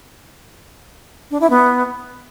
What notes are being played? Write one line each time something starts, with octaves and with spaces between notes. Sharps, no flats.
D4
E4
B3